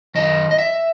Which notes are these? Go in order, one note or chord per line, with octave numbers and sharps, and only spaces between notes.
F#2 D#3 D#5
D#5
E5